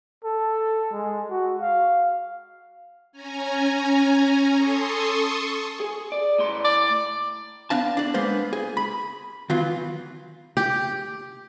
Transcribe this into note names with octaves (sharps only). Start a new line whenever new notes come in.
A4
G#3
F#4
F5
C#4 G#5 A#5
A4 C6 C#6 D#6
G#4
D5
A2 C6
D5
B3 D4 F5 A5
D4 D5
G#3 A#3 B3 C5
G#4
B5
D#3 E3 F#3 B3 F4
G4